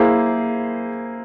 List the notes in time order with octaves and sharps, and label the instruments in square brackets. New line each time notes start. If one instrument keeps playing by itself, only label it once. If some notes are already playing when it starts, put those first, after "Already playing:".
Already playing: [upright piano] A#3 E4 G#4 C5